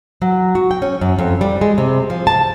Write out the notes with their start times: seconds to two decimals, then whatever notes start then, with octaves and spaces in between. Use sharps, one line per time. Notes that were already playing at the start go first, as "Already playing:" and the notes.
0.22 F#3
0.55 F#4
0.71 G5
0.82 C#4
1.01 F#2
1.19 F2
1.41 G3
1.61 G#3
1.78 C3
2.10 F3
2.27 A5